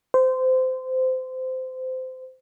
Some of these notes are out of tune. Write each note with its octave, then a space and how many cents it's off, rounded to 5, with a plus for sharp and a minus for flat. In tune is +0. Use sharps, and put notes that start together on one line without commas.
C5 -20